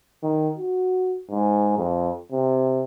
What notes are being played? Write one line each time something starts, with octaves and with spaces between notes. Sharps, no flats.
D#3
F#4
G#2
F2
C3